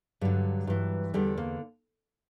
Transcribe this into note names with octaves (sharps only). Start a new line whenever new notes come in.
G2 D3 F#3
G2 E3
E2 D3 G3
A#3